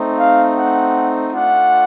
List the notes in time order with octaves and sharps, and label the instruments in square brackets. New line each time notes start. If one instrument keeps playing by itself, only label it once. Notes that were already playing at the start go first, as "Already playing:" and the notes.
Already playing: [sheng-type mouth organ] A3 C4 D#4
[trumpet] F5
F#5
[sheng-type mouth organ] A3 D4 F4 [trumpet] F#5